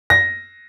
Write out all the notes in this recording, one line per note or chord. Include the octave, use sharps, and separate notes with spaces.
A#6